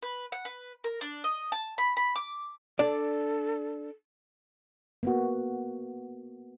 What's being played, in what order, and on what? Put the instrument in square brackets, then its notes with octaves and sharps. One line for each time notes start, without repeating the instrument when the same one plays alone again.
[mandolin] B4
F#5
B4
A#4
D4
D#5
A5
B5
B5
D6
[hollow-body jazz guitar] D4 D5 [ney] A4
[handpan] A#3 B3 F#4